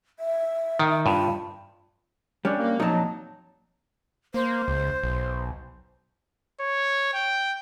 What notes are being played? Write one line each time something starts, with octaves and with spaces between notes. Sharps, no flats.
E5
D#3
G2 F4
G3 C#4 D4
A#3
F2 A#2 F#3 D#4 A5
A#3 C5
C#2
B1
C#5
G5